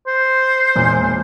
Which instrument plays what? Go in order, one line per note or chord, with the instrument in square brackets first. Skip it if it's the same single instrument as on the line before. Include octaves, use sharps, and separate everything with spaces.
[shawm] C5
[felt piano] E1 A#2